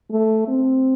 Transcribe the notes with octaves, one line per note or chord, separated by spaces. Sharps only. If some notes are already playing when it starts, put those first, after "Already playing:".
A3
C4